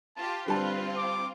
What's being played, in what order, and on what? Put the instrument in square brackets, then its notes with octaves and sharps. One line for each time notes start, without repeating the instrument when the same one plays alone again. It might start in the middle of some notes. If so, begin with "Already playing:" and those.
[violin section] F4 G4 [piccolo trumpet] A5
[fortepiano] D3 G3 A5 [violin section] C4 F4 [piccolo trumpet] B4
[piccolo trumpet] D6